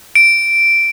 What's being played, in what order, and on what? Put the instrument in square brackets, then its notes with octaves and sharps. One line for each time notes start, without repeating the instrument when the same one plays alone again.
[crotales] D7